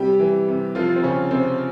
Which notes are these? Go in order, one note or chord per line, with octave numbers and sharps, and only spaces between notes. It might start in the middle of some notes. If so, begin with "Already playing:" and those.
Already playing: C3 G3 G4
E3
C3
C3 F3 F4
C4
C#3 F3 C#4
C3 C4